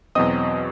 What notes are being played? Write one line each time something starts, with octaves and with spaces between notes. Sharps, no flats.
E2 B2 F#3 C4 D#5 D#6